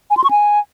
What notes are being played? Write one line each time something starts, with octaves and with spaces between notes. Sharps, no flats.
G#5
C6
C#6
G#5